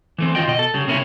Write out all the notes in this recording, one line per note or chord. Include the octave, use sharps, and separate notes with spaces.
E3 A3 C4
D#3 B3 F4 D#5 G5
B2 D#5
A4
C#3 G3
C3 A#3 C#4 D4 E4